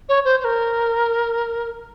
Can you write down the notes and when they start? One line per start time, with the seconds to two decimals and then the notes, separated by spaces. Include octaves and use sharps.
0.09 C#5
0.25 C5
0.40 C5
0.44 A#4